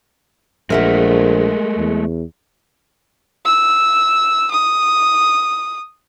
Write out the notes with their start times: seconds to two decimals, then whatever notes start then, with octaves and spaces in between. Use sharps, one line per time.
0.70 A#1 G#3 A3 A#4 E5 F#5
1.78 E2
3.45 E6
4.51 D#6